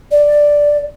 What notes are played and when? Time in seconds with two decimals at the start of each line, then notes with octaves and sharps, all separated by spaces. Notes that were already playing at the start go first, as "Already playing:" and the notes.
0.11 D5